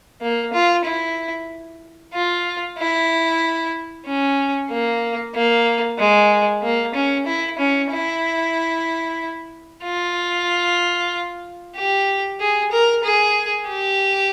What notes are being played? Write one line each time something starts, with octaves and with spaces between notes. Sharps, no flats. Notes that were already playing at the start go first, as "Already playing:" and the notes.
A#3
F4
E4
F4
E4
C#4
A#3
A#3
G#3
A#3
C#4
E4
C#4
E4
F4
G4
G#4
A#4
G#4
G4